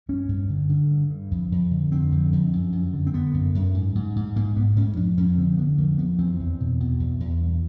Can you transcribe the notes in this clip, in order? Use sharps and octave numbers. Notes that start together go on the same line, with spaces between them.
G2 C#4
G2
D3
D3
G2
G2
F2
F2
D3
D3 C4
F2
F2
F#2
F#2
D3
C4
D3 B3
F#2
F#2
G#2
G#2
G#2
G#2 A#3
G#2 B3
G#2 C#4
F2 D4
F2 C#4
D3 C4
D3 B3
F2 A#3
F2 B3
E2 C4
E2
B2
B2
E2
E2
G2